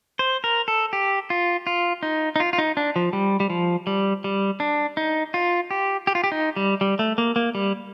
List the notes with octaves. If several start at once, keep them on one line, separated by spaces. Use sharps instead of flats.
C5
A#4
A4
G4
F4
F4
D#4
D#4
F4
F4
D#4
D4
F3
G3
G3
F3
G3
G3
D4
D#4
F4
G4
G4
F4
G4
D#4
G3
G3
A3
A#3
A#3
G3